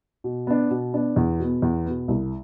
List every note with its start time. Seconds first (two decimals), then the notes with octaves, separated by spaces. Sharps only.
0.24 B2
0.47 B3 D4
0.71 B2
0.93 B3 D4
1.16 E2
1.39 B2 B3
1.62 E2
1.86 B2 B3
2.08 C2